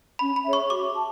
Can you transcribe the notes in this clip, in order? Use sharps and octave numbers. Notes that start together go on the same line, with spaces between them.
C#4 B5
B5
G#4 C#5 E5
C#6
F#4 D6
A5